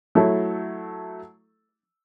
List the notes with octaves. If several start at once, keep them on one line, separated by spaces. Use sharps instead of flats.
F#3 A3 E4 A4